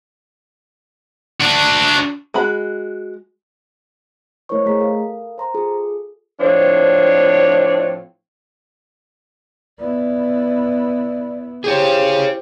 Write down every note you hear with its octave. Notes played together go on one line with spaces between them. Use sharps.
D4 F#4
G#3 F#4 B5
A3 E4 A#4 C5 C#5 C#6
A3 G#4 A#5 B6
A4 A#4 F5
C5 A#5 C6
F4 G#4 A4
A2 F3 C4 D4 C#5
B3 E4 D5
E4 G4 G#4 C5 C#5